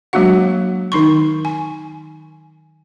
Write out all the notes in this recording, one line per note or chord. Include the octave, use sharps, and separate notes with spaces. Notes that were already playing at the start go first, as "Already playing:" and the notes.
F#3 G#3 A#3 D4 F#4 F#5
D#3 D#4 C6 C#6
G#5